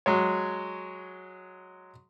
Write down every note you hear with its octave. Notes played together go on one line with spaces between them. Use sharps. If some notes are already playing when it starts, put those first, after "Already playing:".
F#3 G#3 C#5